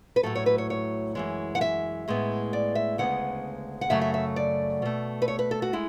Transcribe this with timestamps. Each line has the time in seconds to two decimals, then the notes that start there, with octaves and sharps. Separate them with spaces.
0.16 B4
0.23 A2 F#3 A3 A4
0.35 C#5
0.46 B4
0.58 C#5
0.70 C#5
1.15 F#2 E3 G#3
1.55 F#5
1.61 E5
2.08 A2 G#3 B3
2.53 D5
2.75 E5
2.98 D2 C#3 G#3 B3 F#5
3.81 F#5
3.90 F#2 C#3 F#3 A3 E5
4.02 E5
4.14 E5
4.36 D5
4.82 B2 A3
5.22 B4
5.28 C#5
5.39 B4
5.51 A4
5.62 F#4
5.73 G#3 E4